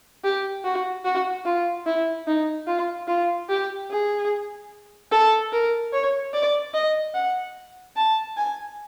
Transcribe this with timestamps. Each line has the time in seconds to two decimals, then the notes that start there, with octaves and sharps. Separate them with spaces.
0.24 G4
0.64 F#4
1.05 F#4
1.45 F4
1.86 E4
2.27 D#4
2.68 F4
3.08 F4
3.50 G4
3.90 G#4
5.12 A4
5.52 A#4
5.93 C#5
6.33 D5
6.74 D#5
7.15 F#5
7.96 A5
8.37 G#5